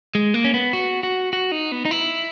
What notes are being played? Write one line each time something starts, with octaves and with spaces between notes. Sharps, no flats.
G#3
A#3
C#4
B3
F#4
F#4
F#4
D#4
B3
D#4
E4